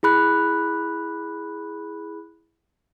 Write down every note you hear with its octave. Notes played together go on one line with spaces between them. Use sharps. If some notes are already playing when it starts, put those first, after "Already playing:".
E4 G#4 B5 F#6